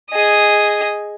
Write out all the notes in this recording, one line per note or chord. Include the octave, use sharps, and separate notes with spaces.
G#4 D#5